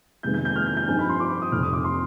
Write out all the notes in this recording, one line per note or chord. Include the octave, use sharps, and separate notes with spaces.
F2 C3 D#3 G#3 B3 G6
G6
G6
F6
G6
G6
G2 F3 C4 D#4 G#5
B5
C6
D6
D6
D#6
F1 F2 C3 F6
D#6
D6
C6